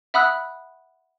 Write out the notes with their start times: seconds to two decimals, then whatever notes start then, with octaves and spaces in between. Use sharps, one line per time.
0.14 E5 F#5 B5 D#6 E6 F#6